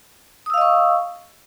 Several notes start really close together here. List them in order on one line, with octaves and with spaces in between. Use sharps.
D#6 E6 F5 D#5 C#6